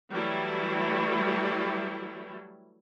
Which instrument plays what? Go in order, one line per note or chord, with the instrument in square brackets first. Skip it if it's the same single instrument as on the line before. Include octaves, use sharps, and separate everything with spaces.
[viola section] E3 F#3 G3 A3 E4